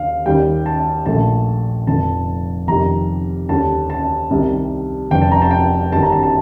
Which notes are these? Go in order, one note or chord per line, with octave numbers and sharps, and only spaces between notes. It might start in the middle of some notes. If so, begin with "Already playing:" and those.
Already playing: D#2 D3 F5
D#2 D#3 G3 G5
A5
A#1 A#2 A3 A5
F1 F2 D3 A5
F1 F2 C3 D#3 G3 A#5
D#2 D3 G3 A5
A5
C2 C3 D#3 G3
F1 F2 C3 G3 G5
A5
A#5
A5
G5
G1 G2 D#3 G3 A5
A#5
A5
A5